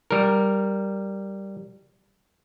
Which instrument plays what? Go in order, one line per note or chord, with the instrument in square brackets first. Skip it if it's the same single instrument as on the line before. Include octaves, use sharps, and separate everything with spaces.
[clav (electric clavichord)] G3 A#4